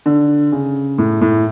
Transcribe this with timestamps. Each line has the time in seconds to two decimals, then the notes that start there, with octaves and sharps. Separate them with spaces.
0.06 D3
0.52 C#3
0.98 A2
1.21 A2